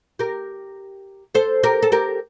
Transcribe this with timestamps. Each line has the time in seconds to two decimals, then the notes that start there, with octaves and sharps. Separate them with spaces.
0.19 G4 A#4
1.35 A4 C5
1.63 G4 A#4
1.82 A4
1.92 G4 A#4